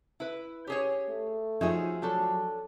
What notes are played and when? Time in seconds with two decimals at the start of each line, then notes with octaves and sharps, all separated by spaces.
0.20 E4 B4
0.67 C#4 G4 G#4 C#5
1.09 A3
1.61 F3 C#4 D#4 F#4 G#4 E5
2.02 F#3 A3 D4 A4